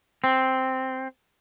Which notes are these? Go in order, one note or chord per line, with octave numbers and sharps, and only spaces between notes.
C4